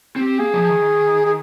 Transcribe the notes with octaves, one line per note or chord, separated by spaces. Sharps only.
C4 G4
A#3 G#4
F3
D#3
G#4